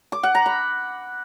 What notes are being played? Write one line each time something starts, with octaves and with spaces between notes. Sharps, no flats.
D6
F#5
A#5
B5